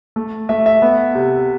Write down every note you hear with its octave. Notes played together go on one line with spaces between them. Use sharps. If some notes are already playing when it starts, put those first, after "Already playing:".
A3
A3 E5
E5
B3
C3